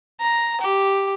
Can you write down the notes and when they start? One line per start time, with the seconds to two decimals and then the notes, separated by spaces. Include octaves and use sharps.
0.21 A#5
0.61 G4